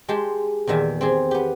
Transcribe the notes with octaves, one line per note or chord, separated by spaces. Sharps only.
G#3 G4 G5 A5 C6
E2 A#2 D#3 E5 G#5
C4 G4 G#4
B3 G4